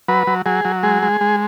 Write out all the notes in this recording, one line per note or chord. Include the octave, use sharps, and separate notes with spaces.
F#3 B4
F#3
F#3 G#4
F#3
G#3 G#4
G#3
G#3